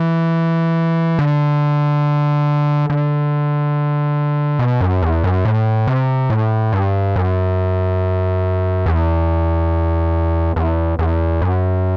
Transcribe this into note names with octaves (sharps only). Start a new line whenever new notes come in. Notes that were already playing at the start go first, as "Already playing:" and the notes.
Already playing: E3
D3
D3
B2
F#2
E2
F#2
A2
C3
A2
G2
F#2
E2
E2
E2
F#2